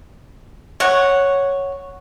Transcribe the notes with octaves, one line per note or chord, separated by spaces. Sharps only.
C#5 F#5